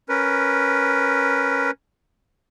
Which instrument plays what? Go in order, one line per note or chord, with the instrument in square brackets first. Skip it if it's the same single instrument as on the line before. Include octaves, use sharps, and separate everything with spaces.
[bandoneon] C#4 A#4 B4